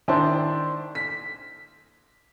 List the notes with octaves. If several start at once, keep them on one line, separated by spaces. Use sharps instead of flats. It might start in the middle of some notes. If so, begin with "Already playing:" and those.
D#3 D4 E4 C5
B6